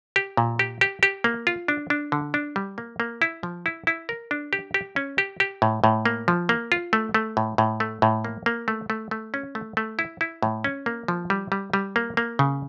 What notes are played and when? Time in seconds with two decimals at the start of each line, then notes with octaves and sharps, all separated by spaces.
0.16 G4
0.37 A#2
0.59 G4
0.81 G4
1.03 G4
1.24 A#3
1.47 F4
1.68 D4
1.90 D4
2.12 D3
2.34 D4
2.56 G3
2.78 A#3
3.00 A#3
3.22 E4
3.43 F3
3.66 E4
3.87 E4
4.09 A#4
4.31 D4
4.53 G4
4.74 G4
4.96 C#4
5.18 G4
5.40 G4
5.62 A2
5.84 A2
6.06 A#3
6.28 F3
6.49 A#3
6.72 F4
6.93 A3
7.14 A3
7.37 A2
7.58 A2
7.80 A3
8.02 A2
8.24 A#3
8.46 A#3
8.68 A3
8.90 A3
9.11 A3
9.34 C#4
9.55 A3
9.77 A3
9.99 E4
10.21 E4
10.43 A2
10.64 C#4
10.86 A#3
11.08 F3
11.30 G3
11.52 G3
11.73 G3
11.96 A#3
12.17 A#3
12.39 C#3